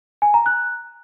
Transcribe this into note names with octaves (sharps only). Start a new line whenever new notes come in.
G#5
A#5
F#6